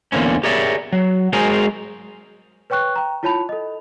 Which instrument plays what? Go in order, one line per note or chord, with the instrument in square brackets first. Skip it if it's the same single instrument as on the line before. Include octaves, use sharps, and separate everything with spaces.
[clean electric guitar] E2 D3 A#3 C4 C#4
G4 G#4 A#4 C#5 D5 E5
F#3
G#3 F#4 G#4 A#4 C5 G#5
[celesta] B4 C#5 G5 C#6 F#6
G5 A#5
E4 F4 C#5 A5 B5 F7
A4 D#5